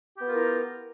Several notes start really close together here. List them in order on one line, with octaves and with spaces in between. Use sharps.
G4 B3 F4 A#4 E4